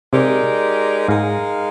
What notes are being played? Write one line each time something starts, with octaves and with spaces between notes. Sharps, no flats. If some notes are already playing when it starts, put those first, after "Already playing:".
C3 G#3 D#4 G4 A#4 D5
G#2 G#3 D#4 A#4 F5